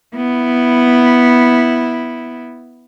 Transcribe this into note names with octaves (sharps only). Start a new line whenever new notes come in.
B3 E4